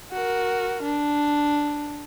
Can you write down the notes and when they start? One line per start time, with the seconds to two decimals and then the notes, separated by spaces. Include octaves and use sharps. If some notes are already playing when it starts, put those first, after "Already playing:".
0.12 F#4 A#4
0.82 D4